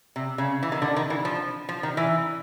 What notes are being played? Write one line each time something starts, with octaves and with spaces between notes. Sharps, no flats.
C3
C#3
E3
D#3
D3
D#3
E3
F3
F3
D#3
E3